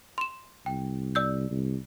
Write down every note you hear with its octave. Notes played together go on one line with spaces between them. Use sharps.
C6 E7
C2 G5
D5 E6 G6
C2